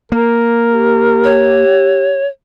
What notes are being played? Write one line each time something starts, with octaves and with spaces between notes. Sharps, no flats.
A#3 A#4
G4
C#5